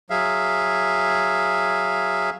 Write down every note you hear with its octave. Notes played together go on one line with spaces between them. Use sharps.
F#3 G#4 E5 F5